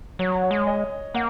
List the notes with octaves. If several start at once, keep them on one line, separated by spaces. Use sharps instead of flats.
F#3 C#5
C#5
G#3
D#5
A#3 F#5